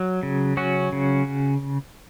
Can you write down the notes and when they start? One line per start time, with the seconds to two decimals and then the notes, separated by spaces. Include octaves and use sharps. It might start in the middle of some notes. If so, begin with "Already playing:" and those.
Already playing: F#3
0.23 C#3
0.57 F#3 C#4 F#4
0.92 C#3